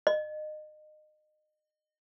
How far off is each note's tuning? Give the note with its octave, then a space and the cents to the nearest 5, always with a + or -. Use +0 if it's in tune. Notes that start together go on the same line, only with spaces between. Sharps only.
D#5 -30